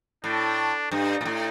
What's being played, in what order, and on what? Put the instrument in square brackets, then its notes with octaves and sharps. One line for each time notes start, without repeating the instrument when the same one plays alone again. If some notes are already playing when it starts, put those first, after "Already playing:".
[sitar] A2 [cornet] D4
[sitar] G2 [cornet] D#4
[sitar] A#2
A2